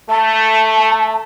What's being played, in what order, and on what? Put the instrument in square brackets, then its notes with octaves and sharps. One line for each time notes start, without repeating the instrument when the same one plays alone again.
[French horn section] A3 [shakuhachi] A5